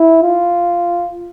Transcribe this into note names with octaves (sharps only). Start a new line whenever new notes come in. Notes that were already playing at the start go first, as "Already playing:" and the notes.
Already playing: E4
F4